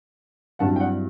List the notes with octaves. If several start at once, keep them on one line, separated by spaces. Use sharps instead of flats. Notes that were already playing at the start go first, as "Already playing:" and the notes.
G2 F#3 C4 E4 F#5 A5
G5
D5 F#5